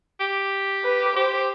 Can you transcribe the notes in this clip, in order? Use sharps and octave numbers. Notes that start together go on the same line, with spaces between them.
G4
B4
G4 C5